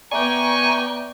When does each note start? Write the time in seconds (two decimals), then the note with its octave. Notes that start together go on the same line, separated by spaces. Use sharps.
0.11 B3 D5 E5 G5 G#5 A#5 C#6 D6